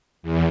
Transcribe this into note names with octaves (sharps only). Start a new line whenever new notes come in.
E2